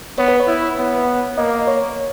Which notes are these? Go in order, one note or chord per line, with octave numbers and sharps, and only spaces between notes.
B3 C#5
B4
C#5
E4
B3
A#3 D#5
C#5